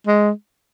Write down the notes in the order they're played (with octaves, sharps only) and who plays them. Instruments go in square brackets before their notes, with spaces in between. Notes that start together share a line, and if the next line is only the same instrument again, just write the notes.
[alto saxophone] G#3